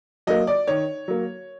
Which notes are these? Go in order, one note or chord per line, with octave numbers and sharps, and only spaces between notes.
F#3 A#3 D#5
D5
D#3 C#5
F#3 A#3